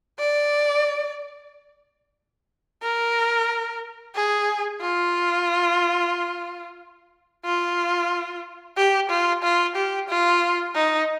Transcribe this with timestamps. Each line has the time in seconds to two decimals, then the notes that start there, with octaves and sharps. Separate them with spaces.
0.19 D5
2.82 A#4
4.14 G#4
4.80 F4
7.45 F4
8.76 G4
9.09 F4
9.43 F4
9.75 G4
10.08 F4
10.74 D#4